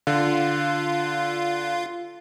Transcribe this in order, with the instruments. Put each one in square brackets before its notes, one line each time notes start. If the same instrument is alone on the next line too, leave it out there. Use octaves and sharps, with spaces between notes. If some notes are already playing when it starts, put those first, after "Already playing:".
[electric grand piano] D3 [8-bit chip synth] F4